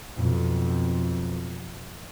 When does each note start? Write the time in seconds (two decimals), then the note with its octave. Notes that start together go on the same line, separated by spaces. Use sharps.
0.15 B1 F2